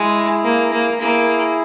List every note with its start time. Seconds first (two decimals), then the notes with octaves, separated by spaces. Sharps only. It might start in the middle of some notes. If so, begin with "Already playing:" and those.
Already playing: G#3 E4 G#4
0.44 A#3
0.72 A#3
1.00 A#3 E4 G#4